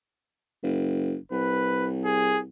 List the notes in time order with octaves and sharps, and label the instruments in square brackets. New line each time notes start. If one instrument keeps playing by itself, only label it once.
[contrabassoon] F#1
[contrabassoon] C2 [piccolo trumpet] B4
[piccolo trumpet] G#4